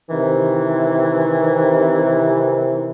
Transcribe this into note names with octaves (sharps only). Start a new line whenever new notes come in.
C3 D#3 E3